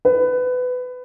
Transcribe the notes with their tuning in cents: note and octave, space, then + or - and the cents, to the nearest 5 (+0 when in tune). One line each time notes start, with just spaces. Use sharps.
B4 +20